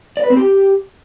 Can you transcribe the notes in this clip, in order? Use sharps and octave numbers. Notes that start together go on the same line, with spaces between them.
D5
B4
C4
G4